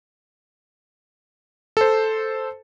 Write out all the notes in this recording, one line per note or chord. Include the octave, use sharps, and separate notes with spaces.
A4 C5